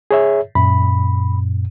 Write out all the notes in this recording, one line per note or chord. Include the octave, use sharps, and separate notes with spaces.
G#4 C#5 E5
F#2 A#2 B5